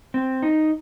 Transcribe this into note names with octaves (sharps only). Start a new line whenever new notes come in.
C4
D#4